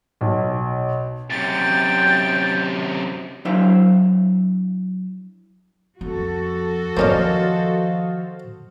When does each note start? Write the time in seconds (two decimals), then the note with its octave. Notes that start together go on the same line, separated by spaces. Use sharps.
0.21 B1
1.30 F#2 C3 G5 A6
3.45 F#3 D4 E4 C5 E5 F5
6.01 F2 F#4 A4
6.97 D#3 F3 A#3 C#4 D4 C5 D#5 F5